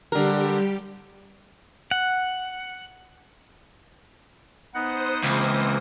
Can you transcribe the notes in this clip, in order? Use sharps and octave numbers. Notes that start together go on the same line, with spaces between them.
D3 G3 G4 A#4
F#5
B3 D#4 C5 F#5 D#6
C#2 E3 A#3 C4